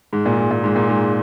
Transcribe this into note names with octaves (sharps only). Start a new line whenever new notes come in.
G#2
A#2
G#2
A#2
G#2
A#2
G#2